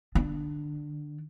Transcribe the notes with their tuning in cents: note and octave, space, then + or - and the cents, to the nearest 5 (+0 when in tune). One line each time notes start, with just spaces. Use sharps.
D3 +25 D4 +10